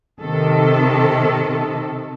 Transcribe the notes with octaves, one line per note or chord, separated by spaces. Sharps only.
C3 D#3 A4